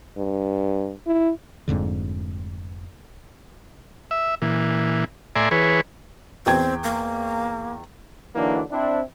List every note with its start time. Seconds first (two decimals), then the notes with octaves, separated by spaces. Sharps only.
0.18 G2
1.07 E4
1.68 F1 F2 G#2 D3
4.11 E5
4.42 A#2 E3
5.36 A2 D5 E5 G#5 A#5 C6
5.51 E3 G#4 B4 C#5
6.46 E2 C4 G5 G#6
6.84 A#3
8.35 D3 E3 F#3 A#3 D4 D#4
8.71 C4 D4 E4